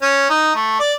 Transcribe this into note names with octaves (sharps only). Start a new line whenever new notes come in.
C#4
D#4
A3
D5